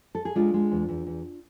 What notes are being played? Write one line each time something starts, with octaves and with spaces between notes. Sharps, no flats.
A4
G#4
G#3 D4 F4
G#3
E2
E2
E2